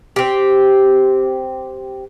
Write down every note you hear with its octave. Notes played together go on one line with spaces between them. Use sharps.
C4 G4